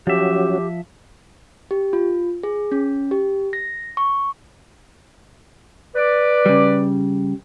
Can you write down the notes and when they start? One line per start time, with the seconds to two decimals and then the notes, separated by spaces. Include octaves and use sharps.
0.07 F3 F#3 C#4 F#4 G4 E5
1.71 G4
1.93 F4
2.43 G#4
2.72 C#4
3.11 G4
3.53 A#6
3.97 C#6
5.95 B4 D5
6.46 C#3 G3